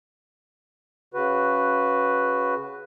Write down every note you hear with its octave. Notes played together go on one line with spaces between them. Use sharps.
C#3 F#4 B4